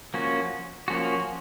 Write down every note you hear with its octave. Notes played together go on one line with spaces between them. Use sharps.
F3 A#3 C#4 F#4
F3 A#3 C#4 F#4